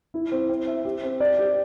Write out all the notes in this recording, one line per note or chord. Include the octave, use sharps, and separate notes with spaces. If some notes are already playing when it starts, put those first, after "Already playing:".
E4
C4
C4
E5
G4
C4
D5
G4